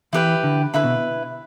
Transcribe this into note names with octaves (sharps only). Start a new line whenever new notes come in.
E3 E4 G4 B4 G5
D3
D3 E4 B4 E5 B5
B2